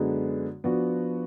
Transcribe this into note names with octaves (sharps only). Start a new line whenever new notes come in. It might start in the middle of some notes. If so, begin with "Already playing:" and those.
Already playing: F#2 D3 G#3 B3
F3 B3 D4 F#4